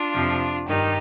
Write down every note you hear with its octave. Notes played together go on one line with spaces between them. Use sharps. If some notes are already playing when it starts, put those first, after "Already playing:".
Already playing: D4 F4
F2 C3 F3
G2 D#3 D#4 G4